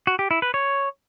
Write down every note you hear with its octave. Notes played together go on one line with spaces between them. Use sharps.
F#4
G4
E4
B4
C#5